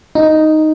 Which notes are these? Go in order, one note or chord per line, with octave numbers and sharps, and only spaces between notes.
D#4